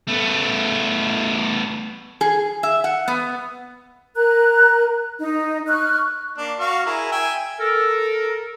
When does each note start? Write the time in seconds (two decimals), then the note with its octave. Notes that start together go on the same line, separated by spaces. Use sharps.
0.07 A3 B3
2.21 G#4
2.63 E5
2.84 F#5
3.08 B3
4.16 A#4 A#5 F#6
5.20 D#4 D#5
5.68 C#6 F6 F#6
6.38 A#3 D4
6.59 F#4 F5 C#6
6.86 E4 G#4 A#4
7.12 E5 G5 G#5
7.60 A4 A#4